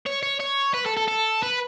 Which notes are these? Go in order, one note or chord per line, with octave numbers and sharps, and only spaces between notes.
C#5
C#5
C#5
B4
A4
A4
A4
B4